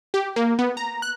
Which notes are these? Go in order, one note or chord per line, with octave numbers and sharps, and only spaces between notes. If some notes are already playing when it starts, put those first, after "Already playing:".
G4
A#3
B3
A#5
F#6